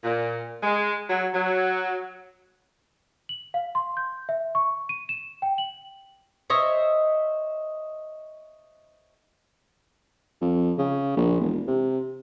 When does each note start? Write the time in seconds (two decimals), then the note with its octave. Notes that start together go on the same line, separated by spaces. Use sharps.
0.04 A#2
0.63 G#3
1.10 F#3
1.34 F#3
3.29 F#7
3.54 F5
3.75 C6
3.97 G6
4.29 E5
4.55 C#6
4.89 D#7
5.09 E7
5.42 G5
5.58 F#7
6.50 C5 C#5 D#5 E5
10.41 F2
10.78 C#3
11.17 A#1
11.41 E1
11.67 C3